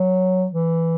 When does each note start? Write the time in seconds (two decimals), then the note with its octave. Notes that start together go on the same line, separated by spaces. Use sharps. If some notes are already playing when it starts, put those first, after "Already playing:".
Already playing: F#3
0.52 E3